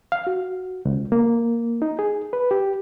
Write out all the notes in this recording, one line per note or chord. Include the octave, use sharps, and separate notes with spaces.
F5
F#4
C#2
A#3
D#4
G#4
B4
G4